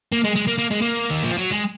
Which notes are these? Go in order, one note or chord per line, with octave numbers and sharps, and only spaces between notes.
A#3
G#3
G#3
A#3
A#3
G#3
A#3
D#3
F3
F#3
G#3